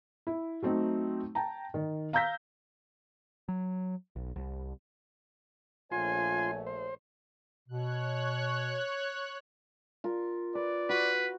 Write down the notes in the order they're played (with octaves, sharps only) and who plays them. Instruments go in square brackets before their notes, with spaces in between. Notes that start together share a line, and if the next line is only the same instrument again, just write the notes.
[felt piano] E4
F#3 A3 C4 D#4
G5 A5 A#5
D#3
F5 A#5 E6 G6 A#6 B6
[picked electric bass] F#3
B1
C2
[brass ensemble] A#1 A3 C#5 [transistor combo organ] F4 C6 [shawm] G#5
[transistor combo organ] C5
[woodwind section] B2 [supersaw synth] C#5 F#6
[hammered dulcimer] F4 A#4
[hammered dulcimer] B4 [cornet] D5
[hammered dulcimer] F#4 [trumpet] B4